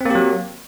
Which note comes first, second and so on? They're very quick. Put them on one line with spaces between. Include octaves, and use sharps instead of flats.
C4 A#3 G4 F#3